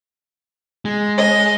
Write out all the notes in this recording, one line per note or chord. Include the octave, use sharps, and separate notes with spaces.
G#3
D#5